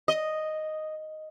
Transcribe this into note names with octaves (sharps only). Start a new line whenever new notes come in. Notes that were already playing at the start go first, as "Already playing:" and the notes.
D#5